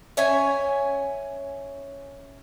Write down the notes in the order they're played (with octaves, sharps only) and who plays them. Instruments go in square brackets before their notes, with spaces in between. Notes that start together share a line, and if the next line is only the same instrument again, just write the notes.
[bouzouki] C#4 C#5 E5 G#5